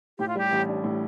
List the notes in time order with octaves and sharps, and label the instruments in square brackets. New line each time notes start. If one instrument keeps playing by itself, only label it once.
[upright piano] A2 [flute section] G4
[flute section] F4
[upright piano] G3 [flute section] G4
[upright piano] A1
D4
A2